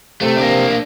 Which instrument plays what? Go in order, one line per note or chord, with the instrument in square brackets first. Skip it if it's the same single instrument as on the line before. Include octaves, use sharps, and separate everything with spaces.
[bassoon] C3 [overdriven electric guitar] A3
[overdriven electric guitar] A#3 D4